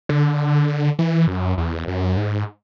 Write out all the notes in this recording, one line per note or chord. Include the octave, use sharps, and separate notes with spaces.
D3
E3
F#2
E2
F#2
G#2